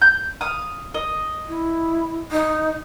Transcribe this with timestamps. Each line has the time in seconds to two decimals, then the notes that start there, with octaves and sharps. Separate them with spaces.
0.02 G6
0.41 F5 D#6
0.94 D#5
1.48 E4
2.31 D#4